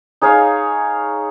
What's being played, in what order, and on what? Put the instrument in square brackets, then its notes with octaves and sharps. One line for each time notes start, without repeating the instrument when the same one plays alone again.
[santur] D#4 G#4 C#5 F5